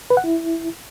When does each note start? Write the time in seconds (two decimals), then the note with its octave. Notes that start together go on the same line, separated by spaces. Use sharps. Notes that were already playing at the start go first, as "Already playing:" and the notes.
0.10 B4
0.17 F#5
0.24 E4